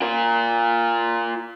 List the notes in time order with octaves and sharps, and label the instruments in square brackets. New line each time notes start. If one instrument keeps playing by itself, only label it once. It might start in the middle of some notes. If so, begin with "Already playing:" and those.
[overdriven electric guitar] F4 A#4